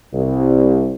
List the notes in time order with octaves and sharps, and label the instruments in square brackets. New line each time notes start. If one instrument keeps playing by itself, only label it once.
[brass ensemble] C2